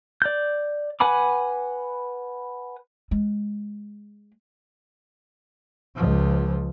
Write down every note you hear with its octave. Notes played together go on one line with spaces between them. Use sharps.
D5 G6
B4 F#5 G#5 B5 D6
G#3
C#2 F3